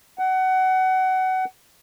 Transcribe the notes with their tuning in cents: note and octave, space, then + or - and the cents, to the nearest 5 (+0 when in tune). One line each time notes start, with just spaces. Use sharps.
F#5 +25